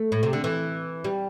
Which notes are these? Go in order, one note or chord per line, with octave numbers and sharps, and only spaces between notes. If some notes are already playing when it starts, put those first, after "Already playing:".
Already playing: A3
A2
C3
D3
E3
G3